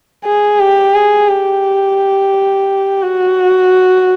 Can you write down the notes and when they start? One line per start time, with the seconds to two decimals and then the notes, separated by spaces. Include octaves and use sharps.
0.25 G#4
0.60 G4
0.94 G#4
1.28 G4
3.02 F#4